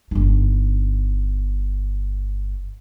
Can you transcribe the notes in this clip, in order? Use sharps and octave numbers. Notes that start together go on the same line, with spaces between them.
G1 D#4